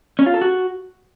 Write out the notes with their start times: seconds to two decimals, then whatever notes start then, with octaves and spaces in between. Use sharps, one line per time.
0.19 C#4
0.26 F4
0.34 A4
0.41 F#4